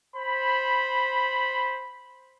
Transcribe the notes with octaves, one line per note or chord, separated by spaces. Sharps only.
C5 B5